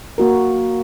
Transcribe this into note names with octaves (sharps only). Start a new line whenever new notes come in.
A#3 F#4 A#4